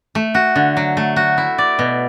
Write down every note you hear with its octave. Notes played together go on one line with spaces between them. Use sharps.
A3
F#4
D3
F#3
A3
F#4
E4
D5
B2